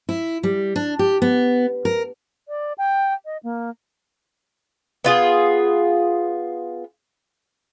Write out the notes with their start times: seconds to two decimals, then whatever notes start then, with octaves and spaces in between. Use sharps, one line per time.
0.09 E4
0.43 G3
0.76 D4
0.99 G4
1.22 B3
1.85 A#4
2.48 D5
2.78 G5
3.25 D#5
3.43 A#3
5.04 B3 F4 G#4